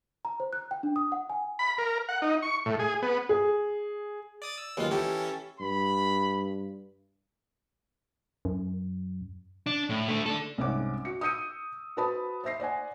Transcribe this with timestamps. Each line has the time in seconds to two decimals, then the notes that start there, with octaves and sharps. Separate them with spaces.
0.25 A#5
0.40 C5
0.53 F#6
0.71 G5
0.83 D4
0.96 D#6
1.12 F#5
1.30 G#5
1.59 B5
1.78 A#4
2.09 F#5
2.22 D#4
2.42 C#6
2.66 A2
2.79 G#4
3.02 B3
3.29 G#4
4.42 D5 D#6 A6
4.58 E6
4.77 D#2 F#3 G#3 B3 F4
4.91 E3 C#4 G4 A4
5.60 G2 B5
8.45 F#2
9.66 D4
9.89 A2
10.08 A3 D4
10.26 D4 A4
10.58 C2 G#2 C4 C#4 F#5 D6
11.05 F#4 C#7
11.21 D#6 E6 G6 C#7 D#7
11.97 F#4 B4 C5 A5 B5 D#6
12.44 C5 E5 A#6 C7
12.60 C5 D5 F#5 G#5